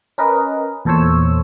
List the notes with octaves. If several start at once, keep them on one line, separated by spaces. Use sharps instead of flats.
C#4 A#4 B4 D#5
E2 A#2 A4 C5 C#5 E6